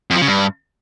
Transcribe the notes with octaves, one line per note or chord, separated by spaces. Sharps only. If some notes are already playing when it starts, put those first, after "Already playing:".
F2
F3
C#3
G2